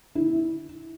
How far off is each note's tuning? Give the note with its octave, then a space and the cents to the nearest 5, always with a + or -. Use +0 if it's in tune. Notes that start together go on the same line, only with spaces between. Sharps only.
E4 -15